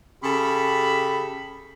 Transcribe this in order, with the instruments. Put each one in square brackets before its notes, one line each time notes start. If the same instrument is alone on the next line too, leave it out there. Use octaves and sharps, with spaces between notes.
[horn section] C#3 G4 A4 B5